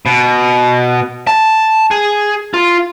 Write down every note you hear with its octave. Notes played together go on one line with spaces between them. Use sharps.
B2
A5
G#4
F4